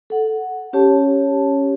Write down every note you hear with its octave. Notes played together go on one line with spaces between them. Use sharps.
A4 F#5
C#4 G4 C#5 A5